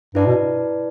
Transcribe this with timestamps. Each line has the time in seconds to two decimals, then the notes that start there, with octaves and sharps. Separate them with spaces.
0.15 G2 E4 B4 D5 A5
0.26 B2